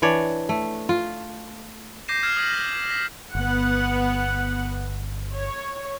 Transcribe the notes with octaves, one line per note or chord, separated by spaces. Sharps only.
E3 D4 C#5 D5
A3
F4
D6 G6 A#6 C7 D#7 E7
E6 F6 G#6 C7 E7
D#6 F6 G#6 B6 D#7 F#7
A#6
A#6 B6
G1 B3 F#5
C#5